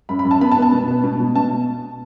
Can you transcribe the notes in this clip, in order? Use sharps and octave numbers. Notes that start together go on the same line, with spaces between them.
F#2 B5
B5
F#2
A5
B3 B5
A5
B3
A5
B2
B3
B2
B2
B2 A5